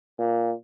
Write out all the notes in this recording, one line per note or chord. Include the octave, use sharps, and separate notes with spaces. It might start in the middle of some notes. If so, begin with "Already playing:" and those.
A#2